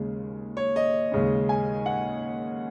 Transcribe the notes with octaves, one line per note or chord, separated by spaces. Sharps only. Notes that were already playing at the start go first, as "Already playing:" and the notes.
Already playing: D#2 C#3 G#3
C#5
D#5
D#2 C#3 G#3 C#4
G#5
F#5